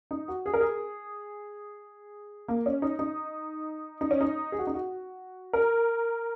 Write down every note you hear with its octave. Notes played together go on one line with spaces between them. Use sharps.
D#4
F#4
G#4
A#4
G#4
A#3
C#4
D#4
D#4
D#4
C#4
D#4
G#4
F#4
D#4
F#4
A#4